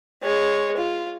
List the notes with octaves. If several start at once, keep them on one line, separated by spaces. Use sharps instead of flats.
G#3 C#5
F4